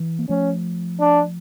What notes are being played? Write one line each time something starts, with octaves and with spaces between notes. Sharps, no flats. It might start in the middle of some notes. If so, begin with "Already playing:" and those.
Already playing: E3
A#3
F3 A3 C#4
D4